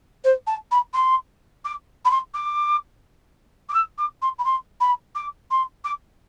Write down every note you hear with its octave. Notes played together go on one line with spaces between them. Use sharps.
C5
A5
B5
C6
D6
B5
C6
D6
D6
E6
D6
C6
B5
C6
B5
D6
C6
D6